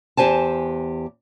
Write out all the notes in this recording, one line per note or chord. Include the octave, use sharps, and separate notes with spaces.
E2 G4 C5 G#5 A5